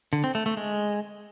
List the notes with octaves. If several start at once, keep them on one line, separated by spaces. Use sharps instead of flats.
D3
C4
A3
A3
G#3